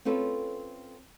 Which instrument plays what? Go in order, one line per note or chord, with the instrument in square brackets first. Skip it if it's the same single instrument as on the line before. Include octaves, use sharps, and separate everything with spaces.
[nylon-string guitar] C4 C#4 F4 A4 B4